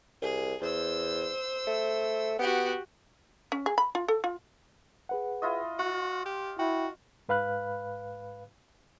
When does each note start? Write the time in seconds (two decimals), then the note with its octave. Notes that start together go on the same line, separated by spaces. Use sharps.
0.22 C2 G#4
0.62 E2 C5 E6
1.67 A3
2.39 B3 F#4 G4
3.52 C#4
3.66 G#4
3.78 B5
3.95 F4
4.08 A4
4.24 F4
5.09 G#4 B4 F#5
5.42 E4 F4 D#5
5.79 F4 F#4 F#6
6.26 G4
6.59 E4 F#4 G5
7.29 G#2 B4 F5 B5 F#6